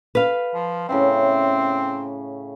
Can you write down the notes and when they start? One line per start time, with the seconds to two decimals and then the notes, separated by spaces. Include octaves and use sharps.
0.15 B4 F5
0.54 F3
0.89 A2 C#3 C4 E5